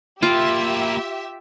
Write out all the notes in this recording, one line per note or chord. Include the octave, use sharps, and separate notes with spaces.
A#3 E4 F4 G4 E5